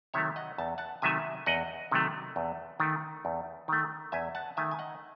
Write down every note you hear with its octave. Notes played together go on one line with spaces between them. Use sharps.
C3 D#3 F#3 A3 C#5 E5
D#5 F#5
E2 A5
F#5 A5
C3 D#3 F#3 A3 E5 G#5
E2 D#5 F#5
C3 D#3 F#3 A3
E2
D#3 A3
E2
D#3 A3
E2 E5 G#5
F#5 A5
D#3 A3 E5 G#5
G#5
D#5 F#5